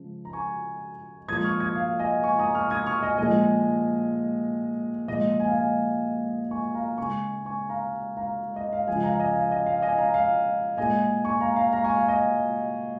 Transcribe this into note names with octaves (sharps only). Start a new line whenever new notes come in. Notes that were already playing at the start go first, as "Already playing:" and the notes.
Already playing: C#3 F3 G#3
A#5
G#5 C#6
A#2 F3 G#3 D#6 G#6
C#6 F6
D#6 G#6
F5
D#5 G#5
G#5 C#6
A#5 D#6
C#6 F6
D#6 G#6
C#6 F6
D#5 G#5
A#2 F3 G#3 D#5 G#5
A#2 F3 G#3 D#5
G#5
F5
D#5 G#5
G#5 C#6
F5 A#5
C#3 G#3 G#5 C#6
G#5 C#6
F5 A#5
F5 A#5
D#5
F5
C#3 F3 G#3 D#5 G#5
F5 A#5
D#5 G#5
F5
D#5
F5
D#5 G#5
F5 A#5
F5
A#2 G#3 D#5 G#5
G#5 C#6
F5 A#5
F5 A#5
F5 A#5
G#5 C#6
F5
D#5 G#5